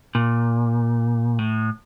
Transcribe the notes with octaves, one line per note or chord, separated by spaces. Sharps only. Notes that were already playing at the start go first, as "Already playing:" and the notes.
A#2
A2